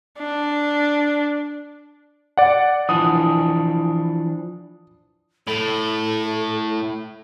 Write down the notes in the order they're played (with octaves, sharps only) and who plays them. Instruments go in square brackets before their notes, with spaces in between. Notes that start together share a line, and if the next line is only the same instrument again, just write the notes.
[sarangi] D4
[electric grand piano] D5 F#5
[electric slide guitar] E3 F3 D4 [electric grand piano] D#6
[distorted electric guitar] A2 [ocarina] A4